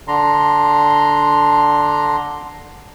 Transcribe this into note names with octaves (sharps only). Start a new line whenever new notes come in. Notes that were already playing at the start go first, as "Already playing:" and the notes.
D3 D4 A#5 C6